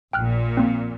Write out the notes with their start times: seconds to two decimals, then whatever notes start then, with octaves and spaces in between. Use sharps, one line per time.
0.13 A#1 A#2 G5 F6 F#6
0.57 A#3 C4